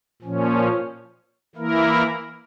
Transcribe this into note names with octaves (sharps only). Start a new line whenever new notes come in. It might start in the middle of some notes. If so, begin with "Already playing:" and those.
A#2 F3 C#4
E3 A#3 E4 A#4